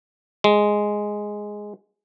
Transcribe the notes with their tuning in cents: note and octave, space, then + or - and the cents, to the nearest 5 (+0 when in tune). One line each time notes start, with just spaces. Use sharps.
G#3 +0